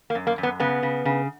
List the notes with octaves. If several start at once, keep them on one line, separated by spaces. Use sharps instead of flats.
A#3
F#2
A#3
F#2
B3
C#3 B3
C#3
C#3